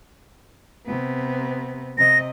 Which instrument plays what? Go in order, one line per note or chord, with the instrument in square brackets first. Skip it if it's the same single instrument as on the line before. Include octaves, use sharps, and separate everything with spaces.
[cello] C3 B3
[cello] C3 D#5 [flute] A#6